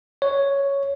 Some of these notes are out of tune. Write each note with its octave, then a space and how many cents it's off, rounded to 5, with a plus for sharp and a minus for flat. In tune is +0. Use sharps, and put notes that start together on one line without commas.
C#5 +5